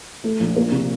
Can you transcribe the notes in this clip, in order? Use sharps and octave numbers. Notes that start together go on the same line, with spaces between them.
A3
A#1
A#3
C3